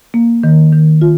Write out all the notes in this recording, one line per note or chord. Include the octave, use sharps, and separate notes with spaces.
A#3
D#3
D#3
F4